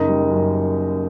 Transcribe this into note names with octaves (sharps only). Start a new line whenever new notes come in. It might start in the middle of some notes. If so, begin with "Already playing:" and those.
Already playing: F#1 D#4 D#5
G3
F#2